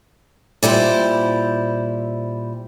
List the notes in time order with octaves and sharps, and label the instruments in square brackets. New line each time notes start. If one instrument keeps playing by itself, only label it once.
[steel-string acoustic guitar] A#2 G3 E4 C5